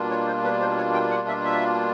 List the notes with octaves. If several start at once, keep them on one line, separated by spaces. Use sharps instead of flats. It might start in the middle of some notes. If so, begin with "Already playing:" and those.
Already playing: B2 G3 A#3 D4 F4
C#5
C5
B4
C5
C#5
G5
F#5
E5
E5